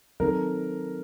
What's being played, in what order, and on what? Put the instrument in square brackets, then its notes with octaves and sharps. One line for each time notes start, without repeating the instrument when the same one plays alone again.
[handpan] D#3 F#3 C4 D#4 A4 [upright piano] A#4